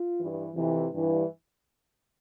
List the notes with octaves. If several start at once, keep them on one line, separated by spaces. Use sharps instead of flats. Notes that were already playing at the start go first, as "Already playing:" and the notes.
Already playing: F4
G2 E3
F2 C3 E3
G2 E3